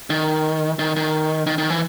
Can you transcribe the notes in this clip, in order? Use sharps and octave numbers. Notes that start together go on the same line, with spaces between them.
D#3
D#3
D#3
D#3
D#3
E3